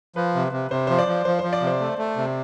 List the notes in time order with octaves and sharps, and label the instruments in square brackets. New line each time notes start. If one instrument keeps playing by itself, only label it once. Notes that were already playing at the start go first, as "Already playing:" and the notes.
[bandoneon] F3 [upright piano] B4
[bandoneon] C3
C3
[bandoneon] C3 [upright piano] C5
[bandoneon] F3 [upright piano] C5
[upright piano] D5
[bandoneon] F3
[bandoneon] F3 [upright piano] C5
[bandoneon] F3 [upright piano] C5
[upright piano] D5
[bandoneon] C3
[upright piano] C5
[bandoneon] A3
A3
C3